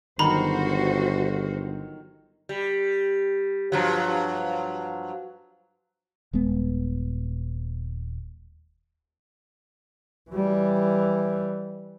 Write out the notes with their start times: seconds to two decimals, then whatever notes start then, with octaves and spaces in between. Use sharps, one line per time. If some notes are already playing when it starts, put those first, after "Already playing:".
0.19 G1 D#3 F#3 F#4 C5 A#5 B5
2.49 G3
3.72 G2 F3 F#3
6.33 D#1 G#3 B3
10.30 E3 G3